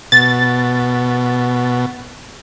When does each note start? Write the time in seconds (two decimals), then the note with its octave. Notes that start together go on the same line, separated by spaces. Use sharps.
0.12 B2 A6